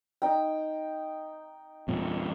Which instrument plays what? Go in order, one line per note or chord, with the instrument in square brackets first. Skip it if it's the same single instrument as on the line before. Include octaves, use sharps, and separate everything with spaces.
[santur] D#4 G5
[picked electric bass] E2 A#2